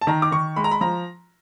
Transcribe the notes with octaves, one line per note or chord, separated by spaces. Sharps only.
A5
D#3 A#5
D6
D#3 C#6
G#3 B5
A#5
B5
F3 A#5